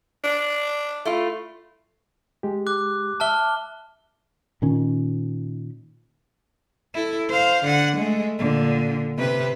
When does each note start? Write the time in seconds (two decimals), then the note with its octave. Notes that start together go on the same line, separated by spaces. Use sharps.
0.24 D4
1.05 A3 E4 F4
2.43 G#3 G4
2.67 D6 F#6
3.20 E5 A5 D6 F6 G7
4.62 A#2 D#3 C#4
6.94 E4 A4
7.29 C5 F5
7.64 D3 F#5
7.97 G#3 A3
8.38 A#2 D3
9.17 C3 B4